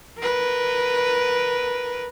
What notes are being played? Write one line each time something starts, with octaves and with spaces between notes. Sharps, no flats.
A#4 B4